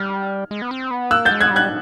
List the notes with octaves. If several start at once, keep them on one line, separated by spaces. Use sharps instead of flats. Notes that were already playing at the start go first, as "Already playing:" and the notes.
Already playing: G3 F6
G#3
B3
C4
B3
A#3 E6 F#6
G6 A6
G#3
F#6 G#6
G3
F#6 G#6